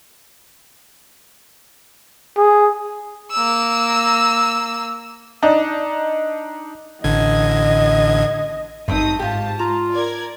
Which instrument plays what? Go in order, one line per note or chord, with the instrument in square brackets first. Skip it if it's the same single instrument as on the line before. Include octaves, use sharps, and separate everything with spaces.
[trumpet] G#4
[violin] A#3 E6
[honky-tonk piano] D4 D#4
[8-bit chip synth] A1 D3 G#6 [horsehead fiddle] D#5
[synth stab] G#1 G2 [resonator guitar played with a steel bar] A3 C4 [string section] D#4 D#6
[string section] G#2 A5 [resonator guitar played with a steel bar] F4 G4
[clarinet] F4 [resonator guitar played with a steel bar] A#5
[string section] A#4 D5 G#6